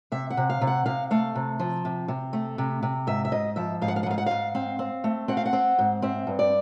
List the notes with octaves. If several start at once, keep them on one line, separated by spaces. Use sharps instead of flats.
C3 E5
F#5
C3
F5
C3
F#5
C3 F5
A3 F5
C3
F3
C3
C3
A3
C3
C3
G#2 E5
E5
G#2 D#5
F3 E5
G#2 F5
F#5
F5
F#5
G#2 F5
F#5
G#2 F5
C4 F5
C4
A3
C4 F#5
F5
F#5
C4
G#2
C4 E5
G2
D5